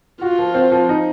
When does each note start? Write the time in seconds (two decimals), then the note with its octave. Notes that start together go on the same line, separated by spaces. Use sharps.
0.21 F4 F#4
0.39 F3
0.55 C4
0.72 F3
0.89 D#4